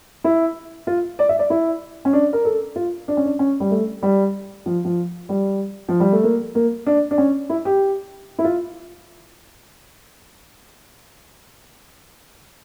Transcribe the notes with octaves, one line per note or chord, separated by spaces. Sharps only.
E4
F4
D5
E5
D5
E4
C#4
D4
A#4
A4
F4
D4
C#4
D4
C#4
G3
A3
G3
F3
F3
G3
F3
G3
A3
A#3
A#3
D4
D4
C#4
E4
G4
E4
F4